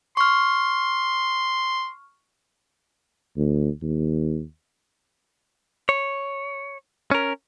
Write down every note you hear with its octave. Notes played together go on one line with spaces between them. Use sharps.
C6 C#6 F6
D2
D#2
C#5
C#4 A#4